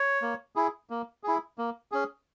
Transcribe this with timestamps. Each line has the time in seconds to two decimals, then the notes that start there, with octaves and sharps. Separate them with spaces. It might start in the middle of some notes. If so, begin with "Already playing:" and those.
Already playing: C#5
0.22 A#3
0.56 E4 G#4
0.90 A#3
1.23 E4 G#4
1.58 A#3
1.92 C#4 G#4